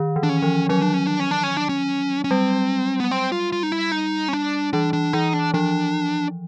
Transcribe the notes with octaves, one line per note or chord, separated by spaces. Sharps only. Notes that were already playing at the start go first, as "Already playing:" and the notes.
Already playing: D#3
E3
D4
C#4
F3
F#3 C#4
D4
C#4
D4
C#4
D4
C#4
D4
C#4
C#4
G3 C4
B3
C4
F4
F4
D#4
E4
D#4
C#4
D4
E3 D4
D4
E3 D#4
D4
F3 D4